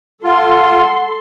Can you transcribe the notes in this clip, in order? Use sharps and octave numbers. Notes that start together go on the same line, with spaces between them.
F4 A4 F#5 C6